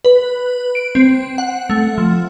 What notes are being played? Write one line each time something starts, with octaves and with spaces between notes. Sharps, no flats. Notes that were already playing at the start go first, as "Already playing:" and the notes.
B4
D7
C4
F#5
A3
F3